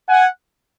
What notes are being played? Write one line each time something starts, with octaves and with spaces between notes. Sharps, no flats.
F#5 G#5